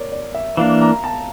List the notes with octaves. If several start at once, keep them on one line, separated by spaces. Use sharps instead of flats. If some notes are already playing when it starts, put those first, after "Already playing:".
Already playing: A#4 C#5 D5
D5
E5
E3 A#3 D4 F5
A#5
A5